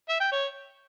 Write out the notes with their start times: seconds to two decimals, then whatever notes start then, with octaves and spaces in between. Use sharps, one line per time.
0.09 E5
0.21 G5
0.32 C#5